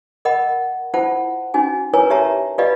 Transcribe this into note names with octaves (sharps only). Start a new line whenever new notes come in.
A#4 D#5 F#5 B5
E4 F4 C5 F#5 A5
C#4 D#4 F#4 G#5
E4 A#4 B4 C#5 G#5 A#5
G4 C#5 E5 A5 A#5
F4 G4 B4 D5 D#5 F5